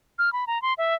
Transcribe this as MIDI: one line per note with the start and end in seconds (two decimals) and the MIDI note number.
0.19 0.32 89
0.33 0.45 83
0.47 0.61 82
0.62 0.74 84
0.78 0.94 76